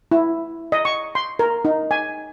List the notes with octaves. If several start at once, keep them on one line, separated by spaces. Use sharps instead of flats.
E4
D#5
C#6
C6
A#4
D#4
G#5